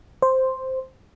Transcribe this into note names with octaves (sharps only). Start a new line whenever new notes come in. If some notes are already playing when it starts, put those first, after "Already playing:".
C5